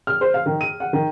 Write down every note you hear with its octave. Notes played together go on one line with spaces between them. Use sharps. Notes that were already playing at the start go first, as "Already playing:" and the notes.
F6
C5
F5
D#3
D#7
F#5
D#3